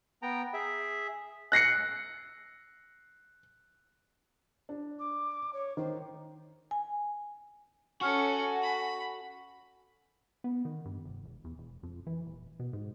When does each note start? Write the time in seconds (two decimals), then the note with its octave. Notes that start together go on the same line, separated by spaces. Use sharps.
0.22 B3 G5 A#5
0.54 G#4 E5
1.52 F#6 A#6 C7 C#7
4.69 D4
4.99 D6
5.53 C#5
5.77 D#3 C5
6.71 G#5
8.01 C#4 F#4 A4 G#5 C#6 F6
8.62 B5
10.44 B3
10.65 D#3
10.85 G2
11.04 F1
11.25 E1
11.44 E2
11.58 E1
11.83 F2
12.07 E3
12.26 D#1
12.59 B2
12.73 G#2